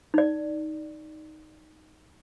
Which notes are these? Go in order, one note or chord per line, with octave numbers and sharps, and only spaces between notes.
D#4 D5